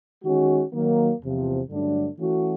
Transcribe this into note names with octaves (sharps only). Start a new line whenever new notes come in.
D#3 G#3 C#4 F#4
D#3 F#3 A#3
E2 C3 F3
G2 D3 F#3 A3 D4
E3 A3 C#4 F#4